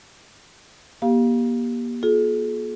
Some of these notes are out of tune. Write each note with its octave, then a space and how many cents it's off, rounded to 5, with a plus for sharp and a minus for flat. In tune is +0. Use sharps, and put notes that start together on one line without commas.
A#3 +45 G4 +0 F5 +0
F4 +35 G#4 +45